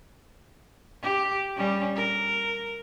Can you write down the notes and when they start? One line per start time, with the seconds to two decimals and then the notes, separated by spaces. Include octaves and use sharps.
1.02 G4
1.56 G3 C#4
1.96 A#4